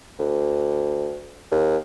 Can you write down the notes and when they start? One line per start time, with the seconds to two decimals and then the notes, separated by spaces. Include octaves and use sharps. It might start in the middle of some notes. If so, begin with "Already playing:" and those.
0.19 D2
1.52 D#2